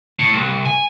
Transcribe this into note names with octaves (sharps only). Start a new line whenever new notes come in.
A2
C2
G#5